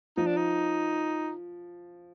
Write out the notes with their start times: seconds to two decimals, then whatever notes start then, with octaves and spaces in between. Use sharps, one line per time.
0.17 F3 D#4
0.27 D4
0.37 D#4